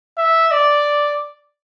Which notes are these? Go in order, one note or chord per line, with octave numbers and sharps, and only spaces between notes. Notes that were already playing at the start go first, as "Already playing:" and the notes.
E5
D5